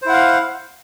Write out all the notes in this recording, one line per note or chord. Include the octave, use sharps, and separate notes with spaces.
E4 C5 F5 F#5